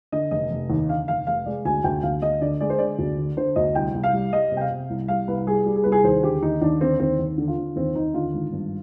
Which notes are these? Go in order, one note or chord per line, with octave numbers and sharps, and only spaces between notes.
D3 D#5
F1 D#5
F1
D#2
D3 F5
F1 F5
F1 F5
G#3 D5
D2 G#5
D2 G5
D2 F5
D2 D#5
D3 D5
G#3 D5
C5
D3 D5
D2
D3
D3 C5
D2 D#5
C2 G5
C2
F5
G3
G3 D#5
C3
G5
F5
C3
C2
G3 F5
C2 B4
G3 G#4
G3
G#4
C2 B4
G#4
D#2 C5
D3 G4
D#2 D#4
D#2 D4
D3 C4
D#2 C4
D#2
D3
F4
D3
D#2 C4
D#2 D#4
D3 F4
G#1
G2